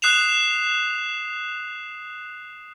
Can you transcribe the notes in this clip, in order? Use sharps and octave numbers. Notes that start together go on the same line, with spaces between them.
D#6 F#6 C7 E7 F7